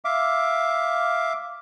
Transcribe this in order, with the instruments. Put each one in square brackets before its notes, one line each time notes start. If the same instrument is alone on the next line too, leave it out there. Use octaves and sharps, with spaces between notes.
[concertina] E5 F5 D6